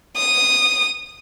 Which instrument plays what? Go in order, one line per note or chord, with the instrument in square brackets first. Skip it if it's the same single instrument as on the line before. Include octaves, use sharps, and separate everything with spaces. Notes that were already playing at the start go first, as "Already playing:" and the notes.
[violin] D#6